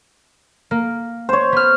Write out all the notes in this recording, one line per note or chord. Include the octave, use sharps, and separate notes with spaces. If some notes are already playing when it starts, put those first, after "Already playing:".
A#3
C5 C#5
B3 F6